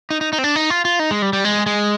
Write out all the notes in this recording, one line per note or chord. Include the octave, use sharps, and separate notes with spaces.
D#4
D#4
D#4
C4
D4
D#4
F4
F4
D#4
G#3
G3
G3
G#3
G#3